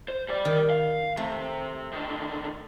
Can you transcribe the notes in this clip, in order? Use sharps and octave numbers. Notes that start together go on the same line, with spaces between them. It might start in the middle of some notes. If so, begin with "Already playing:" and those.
C5
G3 D5
D#3
F5
C3 A3
D3 D#3